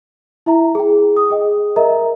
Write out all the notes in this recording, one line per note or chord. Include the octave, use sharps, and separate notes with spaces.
E4 E5 A#5
G#4 G5
D#6
G#4 D#5 G5
A#4 D#5 E5 A#5